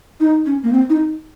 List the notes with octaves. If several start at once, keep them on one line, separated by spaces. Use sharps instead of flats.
D#4
C#4
A#3
C4
D#4